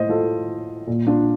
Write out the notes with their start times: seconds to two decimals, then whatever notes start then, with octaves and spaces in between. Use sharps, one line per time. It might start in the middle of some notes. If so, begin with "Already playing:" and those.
Already playing: A2 C5 D#5
0.09 F4 A4
0.87 A#2
1.07 D4 F4